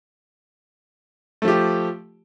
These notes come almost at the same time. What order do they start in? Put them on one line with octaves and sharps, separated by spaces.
A3 F3 G4